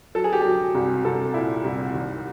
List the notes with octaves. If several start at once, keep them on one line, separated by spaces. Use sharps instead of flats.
F#3 A4
G#4
G4
F#3 G#4
C2
C2 A4
A#2 E4
C2
D#2